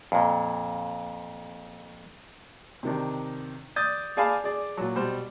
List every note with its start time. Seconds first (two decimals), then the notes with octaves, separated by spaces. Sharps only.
0.12 F2 A#2
2.83 C3 D#3 D4
3.76 D5 D#6 G6 A6
4.17 G#4 D5 F5 G#5 A5 B5
4.44 G#4 D5
4.77 A#2 F#3
4.96 B2 G3 C5